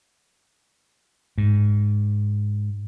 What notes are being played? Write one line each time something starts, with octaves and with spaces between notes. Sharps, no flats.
G#2